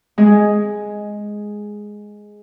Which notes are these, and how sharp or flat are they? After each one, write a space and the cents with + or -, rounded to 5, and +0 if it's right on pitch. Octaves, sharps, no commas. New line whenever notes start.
G#3 +0 G#5 +0